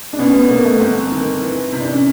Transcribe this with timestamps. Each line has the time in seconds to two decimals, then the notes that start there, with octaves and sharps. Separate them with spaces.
0.13 D4
0.18 B2 C#4
0.34 B3
0.49 B2 A#3
0.65 A3
0.80 G1 C4
1.11 D#3
1.41 E3
1.72 C3
1.80 D4
1.92 C#4